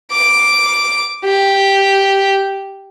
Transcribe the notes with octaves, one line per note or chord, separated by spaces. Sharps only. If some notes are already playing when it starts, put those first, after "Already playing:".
D6
G4